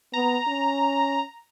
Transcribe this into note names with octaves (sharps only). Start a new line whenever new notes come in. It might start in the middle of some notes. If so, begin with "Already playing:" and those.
B3 A#5
C#4